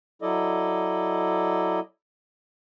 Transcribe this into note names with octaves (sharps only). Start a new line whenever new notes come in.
F#3 E4 A4 D5 D#5